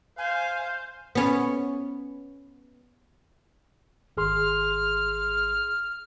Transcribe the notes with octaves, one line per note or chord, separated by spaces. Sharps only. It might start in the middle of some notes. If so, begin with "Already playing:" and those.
C5 F5 G#5
B3 C#4
G#1 G#4 C6 F6